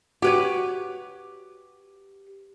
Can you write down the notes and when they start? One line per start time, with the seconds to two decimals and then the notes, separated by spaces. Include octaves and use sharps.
0.22 F#4 G4 B4 C#5